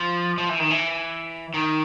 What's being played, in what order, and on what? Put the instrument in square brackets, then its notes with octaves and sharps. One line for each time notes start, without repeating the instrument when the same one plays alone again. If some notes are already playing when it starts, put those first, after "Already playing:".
Already playing: [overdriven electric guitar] F3
F3
E3
D#3
E3
D#3